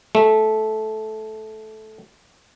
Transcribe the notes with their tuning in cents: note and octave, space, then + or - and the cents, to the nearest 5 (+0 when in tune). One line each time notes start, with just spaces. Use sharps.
A3 -15